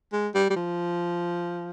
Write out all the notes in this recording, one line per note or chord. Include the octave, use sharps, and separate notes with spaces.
G#3
G3
G3
F3